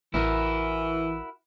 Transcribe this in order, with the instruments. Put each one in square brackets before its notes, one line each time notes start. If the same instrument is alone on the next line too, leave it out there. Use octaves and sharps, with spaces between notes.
[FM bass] A1 [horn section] E3 [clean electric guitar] E4 F#4 A#4